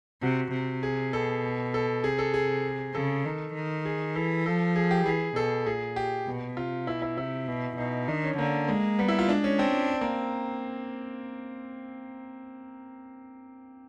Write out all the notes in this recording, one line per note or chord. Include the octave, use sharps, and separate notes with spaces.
C3 F#4
C3
G#4
B2 A4
A4
C3 G#4
A4
G#4
C#3 A4
D#3
D#3
G#4
E3 A4
F3 A4
G#4
G4
E3 G#4
B2 A4
A#2 G#4
G4
B2
C3 F4
B2 E4
E4
C3 E4
B2
B2 D#4
D#3 D4
C#4
D3 A#3
G#3 A#3
G3 B3
E4
F4
G#3 D4
C#4
C4 D4
A#3